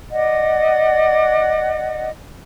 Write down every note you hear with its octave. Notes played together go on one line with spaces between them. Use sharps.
D5 D#5 F#5